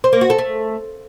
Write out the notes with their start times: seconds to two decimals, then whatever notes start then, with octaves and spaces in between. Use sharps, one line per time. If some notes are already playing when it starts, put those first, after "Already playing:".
0.04 C5
0.13 A#3
0.21 F#4
0.30 A4
0.38 A3